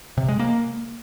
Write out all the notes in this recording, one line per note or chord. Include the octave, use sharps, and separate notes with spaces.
C3
G#3
A#3